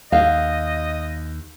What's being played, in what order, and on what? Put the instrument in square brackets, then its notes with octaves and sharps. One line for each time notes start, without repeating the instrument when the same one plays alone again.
[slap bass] D#2 [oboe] D#5 [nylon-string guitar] F5